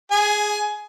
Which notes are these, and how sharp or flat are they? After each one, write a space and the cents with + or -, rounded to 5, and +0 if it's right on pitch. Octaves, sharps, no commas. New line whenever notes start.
G#4 +0 G#5 +20